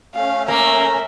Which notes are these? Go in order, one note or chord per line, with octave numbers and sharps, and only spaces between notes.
A3 C#4 F5
A#3 A#4 E5 A#5